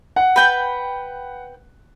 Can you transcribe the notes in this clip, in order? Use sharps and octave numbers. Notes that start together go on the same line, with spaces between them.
F#5
B4 G5 B5